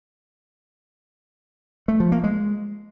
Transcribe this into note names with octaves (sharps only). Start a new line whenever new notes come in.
A3
F3
A#3
G#3